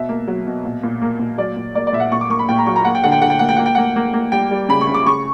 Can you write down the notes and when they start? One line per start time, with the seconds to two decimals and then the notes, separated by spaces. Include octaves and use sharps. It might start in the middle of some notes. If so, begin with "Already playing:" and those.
Already playing: B2 E5
0.09 A#3
0.28 F#3
0.47 B2
0.65 A#2
0.83 A#2
1.02 A#3
1.19 A#2
1.38 F#3 D5
1.56 A#2
1.75 A#3 D5
1.87 D5
1.93 A#2 E5
2.00 F#5
2.12 A#2 C#6
2.21 D6
2.30 A#3 C#6
2.39 B5
2.49 A#2 G5
2.58 A#5
2.66 F#3 C#6
2.76 A#5
2.85 A#3 F#5
2.95 G5
3.03 D3 F#5
3.12 G5
3.22 D3 F#5
3.30 G5
3.39 A#3 F#5
3.49 G5
3.56 A#3 F#5
3.66 G5
3.75 A#3 F#5
3.96 A#3
4.13 A#3
4.32 G3 G5
4.51 G3
4.69 C#3 B5
4.81 C#6
4.88 C#3
4.94 D6
5.06 C#3 C#6